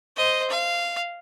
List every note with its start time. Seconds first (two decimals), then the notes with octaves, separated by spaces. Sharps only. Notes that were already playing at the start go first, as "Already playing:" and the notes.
0.17 C5 D#5
0.50 F5